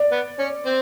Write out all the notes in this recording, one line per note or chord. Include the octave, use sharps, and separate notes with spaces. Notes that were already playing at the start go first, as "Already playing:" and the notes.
Already playing: D5
B3 B4
C#4 C#5
C4 C5